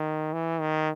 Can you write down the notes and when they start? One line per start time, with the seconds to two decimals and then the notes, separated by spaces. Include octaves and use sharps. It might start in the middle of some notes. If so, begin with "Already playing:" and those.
Already playing: D#3
0.33 E3
0.61 D#3